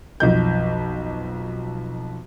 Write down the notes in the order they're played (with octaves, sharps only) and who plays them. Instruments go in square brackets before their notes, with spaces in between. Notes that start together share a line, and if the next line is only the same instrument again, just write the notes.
[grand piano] B1 F2 G6